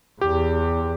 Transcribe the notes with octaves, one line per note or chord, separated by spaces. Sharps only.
E2 G4